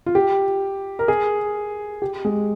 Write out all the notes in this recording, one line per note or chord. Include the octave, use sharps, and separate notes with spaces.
F4
G4
A#4
G#4
G4
G#3